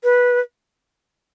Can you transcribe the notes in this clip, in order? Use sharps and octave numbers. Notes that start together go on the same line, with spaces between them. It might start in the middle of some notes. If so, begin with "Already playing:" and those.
B4